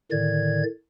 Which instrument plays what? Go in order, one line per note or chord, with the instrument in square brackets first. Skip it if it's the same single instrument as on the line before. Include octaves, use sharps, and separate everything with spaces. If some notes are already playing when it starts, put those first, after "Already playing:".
[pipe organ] A2 D3 D#3 D5 G#6